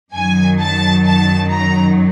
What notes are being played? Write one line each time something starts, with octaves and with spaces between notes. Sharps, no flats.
F#2 D#3 F#3 G#5
A5
A5
A#5